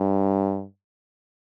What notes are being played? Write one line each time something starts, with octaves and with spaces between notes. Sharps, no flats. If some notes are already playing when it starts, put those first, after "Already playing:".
Already playing: G2